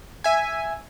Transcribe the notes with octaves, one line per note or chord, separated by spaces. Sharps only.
E5 G#5